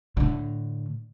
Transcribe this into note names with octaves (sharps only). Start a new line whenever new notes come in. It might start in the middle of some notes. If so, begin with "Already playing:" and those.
A2 D3